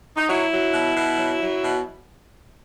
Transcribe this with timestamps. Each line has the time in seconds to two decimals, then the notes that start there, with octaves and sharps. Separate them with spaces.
0.17 D#4
0.28 F#3 E4
0.51 F#3
0.73 B2
0.96 B2
1.18 F#3
1.40 F#3
1.62 B2